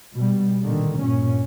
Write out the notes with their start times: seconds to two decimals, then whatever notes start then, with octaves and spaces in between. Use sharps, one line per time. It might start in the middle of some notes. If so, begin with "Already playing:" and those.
0.14 B2 G3
0.63 A#2 D3 D#3
0.97 G2 A#2 C#4